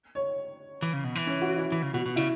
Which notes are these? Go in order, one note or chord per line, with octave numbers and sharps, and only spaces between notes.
C#5
E3
C#3
B2
E3
C#4
F#4
E4
E3
C#3
B2 F#4
B2
C#3 E4